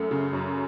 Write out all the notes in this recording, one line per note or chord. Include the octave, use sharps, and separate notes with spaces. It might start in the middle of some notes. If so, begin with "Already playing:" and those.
Already playing: F#2 A3
C#3
F#2